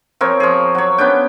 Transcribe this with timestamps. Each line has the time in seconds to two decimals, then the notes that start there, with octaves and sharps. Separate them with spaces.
0.21 F3 C4 A#4 C#5
0.40 F3 G#4
0.75 F#3 C#5
0.98 B3 C#4 D4 G5